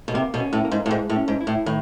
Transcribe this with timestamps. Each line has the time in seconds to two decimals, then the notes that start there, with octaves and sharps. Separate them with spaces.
0.08 B2
0.14 C3 A#3
0.34 B2
0.40 C#4
0.53 A2
0.65 A#3
0.71 G#2
0.86 A2
0.91 G#2 G#3
1.10 A2
1.16 C#4
1.28 G#2
1.41 E4
1.47 A2
1.66 A2 D#3